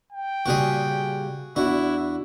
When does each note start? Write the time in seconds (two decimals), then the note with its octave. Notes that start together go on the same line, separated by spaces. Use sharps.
0.13 G5
0.46 A#2 C#3 G3 F#4 G#4
1.56 E2 D4 E4 F#4